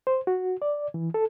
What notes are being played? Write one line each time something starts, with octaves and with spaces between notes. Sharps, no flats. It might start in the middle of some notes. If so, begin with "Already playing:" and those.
C5
F#4
D5
E3
A4